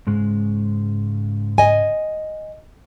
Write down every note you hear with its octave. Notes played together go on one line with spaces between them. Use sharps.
G#2 C#3 G#3
D#5 G#5